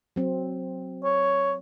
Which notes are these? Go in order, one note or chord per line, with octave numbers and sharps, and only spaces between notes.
F#3 C4
C#5